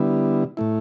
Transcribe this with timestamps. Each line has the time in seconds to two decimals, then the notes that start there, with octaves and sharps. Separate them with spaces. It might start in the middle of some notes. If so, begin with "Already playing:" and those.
Already playing: D3 G3 B3 E4
0.57 A2 A3 E4